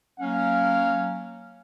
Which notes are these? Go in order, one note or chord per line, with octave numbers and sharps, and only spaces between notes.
F#3 A#3 C#4 F5